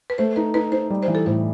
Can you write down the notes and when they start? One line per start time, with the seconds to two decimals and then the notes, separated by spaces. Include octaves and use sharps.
0.10 B4
0.18 A3 C5
0.36 D#4 B4
0.54 D#4 B4
0.72 D#4 C5
0.90 G3
1.03 C5
1.08 E3
1.15 A4
1.26 A2 C5